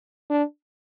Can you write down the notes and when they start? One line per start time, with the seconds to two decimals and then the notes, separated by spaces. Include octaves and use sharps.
0.30 D4